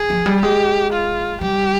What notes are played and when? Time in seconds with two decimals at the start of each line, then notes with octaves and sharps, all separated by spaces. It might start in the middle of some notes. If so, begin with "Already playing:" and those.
Already playing: G#4
0.10 F3
0.26 G3
0.42 G#3 G4
0.93 F4
1.41 G3 G4